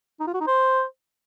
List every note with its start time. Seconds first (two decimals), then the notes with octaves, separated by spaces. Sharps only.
0.20 D#4
0.27 F4
0.34 F#4
0.40 D#4
0.47 C5